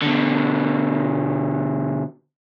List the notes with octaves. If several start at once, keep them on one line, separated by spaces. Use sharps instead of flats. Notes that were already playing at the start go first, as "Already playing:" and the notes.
B2 D3